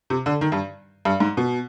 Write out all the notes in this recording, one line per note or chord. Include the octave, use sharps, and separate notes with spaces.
C3
D3
D#3
G2
G2
G#2
B2